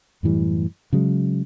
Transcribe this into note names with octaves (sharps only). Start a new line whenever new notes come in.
F#2 A2 E3 G3
C#3 F#3 G#3